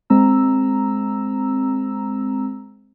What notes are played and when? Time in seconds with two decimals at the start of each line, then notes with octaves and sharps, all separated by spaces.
0.10 G#3 C4 A#5 E6